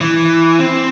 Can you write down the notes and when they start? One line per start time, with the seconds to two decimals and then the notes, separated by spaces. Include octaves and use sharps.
0.01 E3
0.59 C4